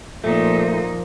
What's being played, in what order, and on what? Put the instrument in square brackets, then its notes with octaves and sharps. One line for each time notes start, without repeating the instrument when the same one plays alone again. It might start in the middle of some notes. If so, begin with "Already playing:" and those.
[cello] A#2 D#4 [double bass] F3 A#3 [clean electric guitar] A3